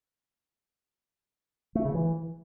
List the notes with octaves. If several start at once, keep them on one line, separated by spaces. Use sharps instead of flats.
A3
C#3
E3